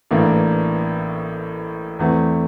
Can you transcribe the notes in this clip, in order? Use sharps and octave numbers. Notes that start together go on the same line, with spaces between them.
A1 A2 E3 A#3 D4
E2 E3 A3 C4